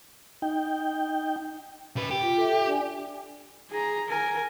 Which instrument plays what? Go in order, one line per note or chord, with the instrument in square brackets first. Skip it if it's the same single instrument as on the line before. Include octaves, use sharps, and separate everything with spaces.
[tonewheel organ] D#4 G5
[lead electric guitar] C#3 B4
G4
[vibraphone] F4
A4 E5
D4 D5 G#5
[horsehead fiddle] G#4 A#5
A#4 G#5